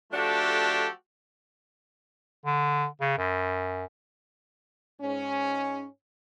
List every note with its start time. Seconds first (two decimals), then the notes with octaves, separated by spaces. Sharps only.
0.12 F3 A3 D4 F#4 G4 A4
2.46 D3
3.01 C#3
3.18 F#2
5.01 G#2 C#4